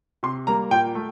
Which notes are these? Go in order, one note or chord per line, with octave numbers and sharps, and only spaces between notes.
C3 C6
G3 A#3 A#5
A#2 G5
A3